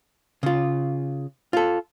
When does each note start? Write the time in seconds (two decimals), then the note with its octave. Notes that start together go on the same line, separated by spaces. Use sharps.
0.43 C#3 F4
1.53 F4 A4